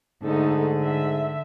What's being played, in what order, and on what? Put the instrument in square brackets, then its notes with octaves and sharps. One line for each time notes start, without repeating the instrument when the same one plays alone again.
[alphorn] G#2 [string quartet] D3 [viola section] A3 D#4 A4
[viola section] E5